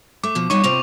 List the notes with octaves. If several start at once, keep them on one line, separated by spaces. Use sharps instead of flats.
A3 D6
B2 F3
G3 D#4 C#5 C#6
C3 C4 F4 F7